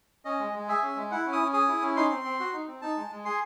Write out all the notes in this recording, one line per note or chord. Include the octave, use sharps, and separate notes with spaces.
C#4 D#5
G#3
G#3
G#4 E5
C#4
G#3
E4 F#5
C#4
D#6
C#4
G#4 D#6
E4
C#4
D#4 C6
C4
C4
F#4
D#4
C4
D#4 A5
G#3
G#3
G#4 C6